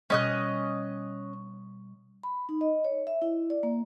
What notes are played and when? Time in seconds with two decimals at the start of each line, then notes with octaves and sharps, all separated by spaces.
0.10 B2 G3 C#4 D#5 F#6
2.23 B5
2.49 D#4
2.61 D#5
2.84 C#5
3.07 E5
3.22 E4
3.50 D5
3.63 A#3